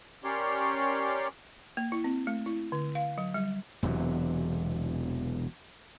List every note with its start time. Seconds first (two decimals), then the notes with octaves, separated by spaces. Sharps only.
0.24 C#4 G4 A#4 C#5 D5 C6
1.77 A#3
1.92 E4
2.04 C4
2.27 A3
2.46 E4
2.72 D3
2.95 F5
3.18 F#3
3.34 G3
3.83 E1 E2 C3 F#3